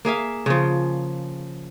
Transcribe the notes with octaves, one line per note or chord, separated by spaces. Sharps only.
A#3 G#4 E5 F5
C#3 F3